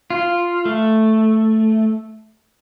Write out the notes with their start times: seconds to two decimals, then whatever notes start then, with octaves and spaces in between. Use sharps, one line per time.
0.10 F4
0.65 A3